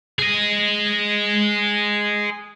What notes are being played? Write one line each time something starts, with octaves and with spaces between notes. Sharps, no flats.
G#4 D#5